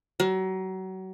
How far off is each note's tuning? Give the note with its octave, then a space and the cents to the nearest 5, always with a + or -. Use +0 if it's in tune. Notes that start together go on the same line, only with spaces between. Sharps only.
F#3 +30